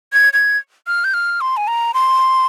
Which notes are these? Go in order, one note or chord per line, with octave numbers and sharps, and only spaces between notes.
G#6
G#6
F6
G6
F6
C6
G#5
A#5
C6